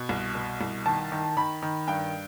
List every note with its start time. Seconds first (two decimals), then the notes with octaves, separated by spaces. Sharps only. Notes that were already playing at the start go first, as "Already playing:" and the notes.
Already playing: B2
0.09 C2
0.35 B2
0.61 C2
0.86 D#3 A5
1.12 D#3
1.37 D#3 B5
1.63 D#3
1.88 G2 G5